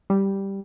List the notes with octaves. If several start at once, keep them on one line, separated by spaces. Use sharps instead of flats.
G3